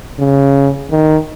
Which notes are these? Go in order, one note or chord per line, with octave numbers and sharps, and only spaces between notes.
C#3
D#3